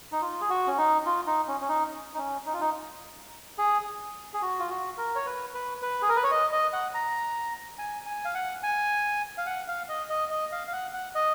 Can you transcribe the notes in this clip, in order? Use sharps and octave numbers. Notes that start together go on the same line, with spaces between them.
D#4
F4
G#4
F#4
C#4
D#4
F4
D#4
C#4
C#4
D#4
D#4
C#4
D#4
F4
D#4
G#4
G#4
F#4
F4
F#4
A#4
C#5
B4
B4
B4
G#4
A#4
B4
C#5
D#5
D#5
F#5
A#5
G#5
G#5
F5
F#5
G#5
F5
F#5
F5
D#5
D#5
D#5
F5
F5
F#5
F#5
D#5